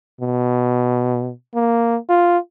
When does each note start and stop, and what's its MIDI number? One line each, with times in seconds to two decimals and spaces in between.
0.21 1.31 47
1.55 1.97 58
2.09 2.38 65